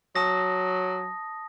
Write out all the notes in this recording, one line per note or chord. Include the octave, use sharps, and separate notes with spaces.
F#3 A5 D#6 A#6